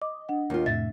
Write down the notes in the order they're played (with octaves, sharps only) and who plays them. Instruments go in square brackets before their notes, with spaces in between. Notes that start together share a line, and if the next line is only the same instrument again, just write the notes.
[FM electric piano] D#5 [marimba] D6
[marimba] D4 F#5
[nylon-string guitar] D#2 F4
[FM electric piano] F2 A2 C3 [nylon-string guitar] E5 [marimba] A6